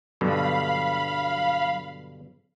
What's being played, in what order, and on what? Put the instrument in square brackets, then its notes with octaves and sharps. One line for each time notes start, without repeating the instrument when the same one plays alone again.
[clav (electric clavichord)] G2 B2 D3 [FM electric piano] F#3 [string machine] F5 B5